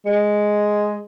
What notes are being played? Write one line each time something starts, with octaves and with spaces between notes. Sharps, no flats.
G#3